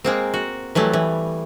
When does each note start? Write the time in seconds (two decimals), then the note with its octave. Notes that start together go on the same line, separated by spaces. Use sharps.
0.04 G#3 A#3 C4
0.34 F#4
0.75 E3 F#3 G3 A3
0.93 E3